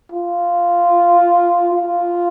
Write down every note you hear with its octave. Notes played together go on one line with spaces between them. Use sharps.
F4
F4